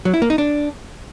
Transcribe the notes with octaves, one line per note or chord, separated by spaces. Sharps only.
F#3
E4
A#3
D#4
D4